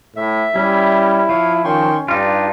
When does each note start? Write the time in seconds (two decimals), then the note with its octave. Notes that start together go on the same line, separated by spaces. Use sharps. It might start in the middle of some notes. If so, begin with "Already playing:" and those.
0.16 A2 E5
0.56 G3 C#4 E4
1.29 F3 C#5 F5
1.64 D#3 C#4 G5 C6 C#6
2.08 G2 D4 D#4 F4 G4